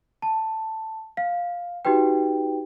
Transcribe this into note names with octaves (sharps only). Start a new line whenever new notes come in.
A5
F5
D#4 F#4 G4 B4 G5